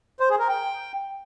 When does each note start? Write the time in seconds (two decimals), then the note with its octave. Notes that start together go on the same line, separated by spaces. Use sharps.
0.20 C5
0.30 G#4
0.39 A#4
0.49 G5